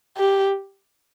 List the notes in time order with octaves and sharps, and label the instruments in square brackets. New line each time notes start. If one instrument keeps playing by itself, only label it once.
[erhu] G4